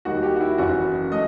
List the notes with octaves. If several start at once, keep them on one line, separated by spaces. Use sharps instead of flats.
D#2 D#3 G3 F#4
G4
F#4
E4
F#1 F#2 E3 F#4
A3 D#5